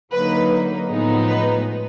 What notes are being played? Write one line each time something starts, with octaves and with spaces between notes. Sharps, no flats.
D3 F#3 A#3 D#4 B4
A2 F3 G#3 B3 D#4
B4